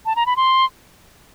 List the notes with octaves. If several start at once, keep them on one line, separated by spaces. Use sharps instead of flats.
A5
A#5
B5
C6